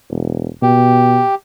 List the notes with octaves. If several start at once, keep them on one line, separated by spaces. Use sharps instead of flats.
E1
B2 G4